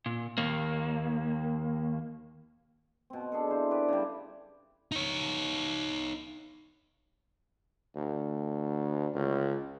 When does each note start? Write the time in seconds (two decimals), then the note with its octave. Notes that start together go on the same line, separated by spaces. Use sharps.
0.06 A#2
0.38 D#2 A#3
3.10 B2 C4
3.32 D4 G#4 A4
3.47 E4 C5
3.70 G4 B4 D5
3.88 C#3 G3
4.92 D#4 C#5
7.96 D2
9.14 C#2